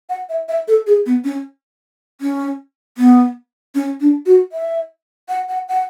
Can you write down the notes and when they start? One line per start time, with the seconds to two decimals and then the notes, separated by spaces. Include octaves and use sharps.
0.09 F#5
0.29 E5
0.48 E5
0.68 A4
0.87 G#4
1.06 B3
1.24 C#4
2.21 C#4
2.98 B3
3.75 C#4
4.01 D4
4.26 F#4
4.52 E5
5.29 F#5
5.49 F#5
5.68 F#5